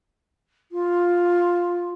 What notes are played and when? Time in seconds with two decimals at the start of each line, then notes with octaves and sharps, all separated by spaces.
0.72 F4